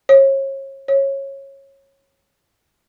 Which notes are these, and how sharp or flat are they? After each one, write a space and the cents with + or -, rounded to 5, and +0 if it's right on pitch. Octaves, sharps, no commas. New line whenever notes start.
C#5 -35
C#5 -20